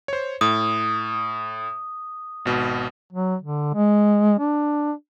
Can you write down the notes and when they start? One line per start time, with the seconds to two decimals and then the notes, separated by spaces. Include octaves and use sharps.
0.08 C5 C#5
0.41 A2 D#6
2.45 G#1 B2
3.13 F#3
3.42 D3
3.74 G#3
4.39 D4